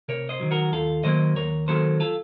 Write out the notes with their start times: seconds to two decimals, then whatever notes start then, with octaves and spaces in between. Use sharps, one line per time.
0.08 C3 A#4 C#5
0.29 C5 D#5
0.40 D#3 F#3
0.51 F#4 A#4
0.72 D#2 F4 A4
1.04 D#3 F#3 A#3 C5 D#5
1.35 D#2 A#4 C#5
1.68 D#3 F#3 A#3 A4 C5
2.00 F4 A4